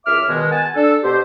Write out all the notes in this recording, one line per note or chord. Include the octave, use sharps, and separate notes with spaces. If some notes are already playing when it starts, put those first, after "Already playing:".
C#2 F#2 E5 D6 F6
B2 D#3 G#3
F#5 G#5 A5
D4 A4
B2 G4 C5